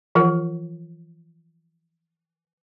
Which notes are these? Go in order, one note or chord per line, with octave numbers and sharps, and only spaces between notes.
E3 F3 F4 A#4 F#5